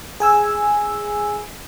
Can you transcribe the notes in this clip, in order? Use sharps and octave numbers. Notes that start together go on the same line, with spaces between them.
G#4 G#5 E6